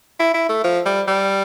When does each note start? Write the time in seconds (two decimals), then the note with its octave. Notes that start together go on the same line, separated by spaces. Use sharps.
0.19 E4
0.34 E4
0.49 A3
0.64 F3
0.86 G3
1.08 G3